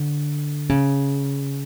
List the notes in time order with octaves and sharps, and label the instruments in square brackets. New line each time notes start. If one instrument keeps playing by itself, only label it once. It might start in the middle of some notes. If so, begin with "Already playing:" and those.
Already playing: [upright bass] D3
C#3